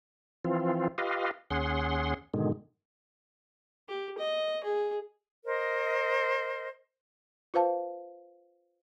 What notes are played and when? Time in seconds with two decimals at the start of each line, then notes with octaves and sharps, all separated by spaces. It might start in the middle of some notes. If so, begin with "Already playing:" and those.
0.45 E3 F3 C4 F4
0.98 F4 G4 B4 D#5 F5
1.51 D#2 C#4 G#4 F#5 C6
2.34 G#2 B2 D3 D#3 G#3
3.88 G4
4.18 D#5
4.64 G#4
5.44 A#4 C5 D#5
7.54 F4 B4 C5 F5 A5